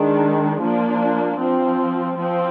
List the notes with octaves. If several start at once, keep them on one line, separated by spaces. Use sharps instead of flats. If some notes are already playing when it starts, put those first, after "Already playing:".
Already playing: D#3 G#3 D4
F3 A#3 D4
F3 C4
F3 C4